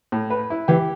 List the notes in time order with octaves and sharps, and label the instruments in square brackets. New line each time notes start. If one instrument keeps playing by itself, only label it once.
[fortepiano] A2
B4
E4
[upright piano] E3 [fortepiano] G4